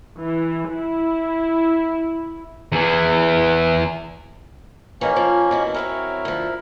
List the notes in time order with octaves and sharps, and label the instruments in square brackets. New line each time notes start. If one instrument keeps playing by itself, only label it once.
[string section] E3
E4
[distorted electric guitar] E2 E3
[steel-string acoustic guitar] E3 G#3 G4 [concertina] A#3 C#4
[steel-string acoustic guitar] F3 C5
B2 E3 E4
[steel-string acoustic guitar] F#3 C4 C#4 [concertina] E4 A#4
[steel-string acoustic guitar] D2 F3